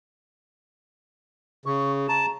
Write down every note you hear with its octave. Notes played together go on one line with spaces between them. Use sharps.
C#3 C#6
A5 A#5